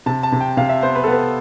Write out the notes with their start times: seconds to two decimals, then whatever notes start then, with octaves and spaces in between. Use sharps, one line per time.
0.06 C3 A5
0.23 A5
0.32 C3
0.40 G5
0.57 C3 F5
0.69 E5
0.82 B3 C5
0.95 B4
1.04 A4
1.08 B3 B4